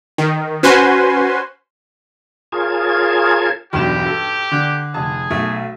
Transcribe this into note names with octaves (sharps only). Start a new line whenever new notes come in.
D#3
C#4 F#4 B4 C5 G#5 C6
F4 G#4 A#4 C#5 A5 G#6
E1 B1 G2 G4 E7
A4
D3
F1 G#4 A5
B1 A3